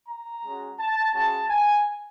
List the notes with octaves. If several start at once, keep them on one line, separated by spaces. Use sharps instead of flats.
A#5
G#3 C#4 F#4
A5
G#3 C#4 F#4 A5
G#5